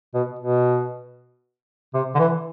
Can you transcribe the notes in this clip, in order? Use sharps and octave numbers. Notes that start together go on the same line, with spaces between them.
B2
B2
C3
D3
E3